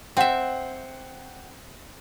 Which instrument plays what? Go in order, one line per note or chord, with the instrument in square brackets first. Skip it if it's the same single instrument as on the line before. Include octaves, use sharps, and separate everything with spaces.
[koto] C4 E5 [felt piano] F#5 G5